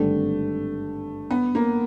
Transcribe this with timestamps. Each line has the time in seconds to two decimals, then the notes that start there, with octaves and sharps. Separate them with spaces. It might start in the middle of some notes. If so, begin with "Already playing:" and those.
Already playing: G#1 G2 D3 G3 A3 C4
1.31 B3
1.55 A#3